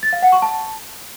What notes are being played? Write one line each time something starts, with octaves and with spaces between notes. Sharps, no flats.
A6
F5
F#5
C#6
A5